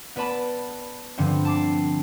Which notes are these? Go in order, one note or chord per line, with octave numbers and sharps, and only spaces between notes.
B3 B4 D5 A5 B5
G2 D3 F3 C4
A5 D6 C7